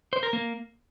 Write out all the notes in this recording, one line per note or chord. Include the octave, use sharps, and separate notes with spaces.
C5
A#4
A#3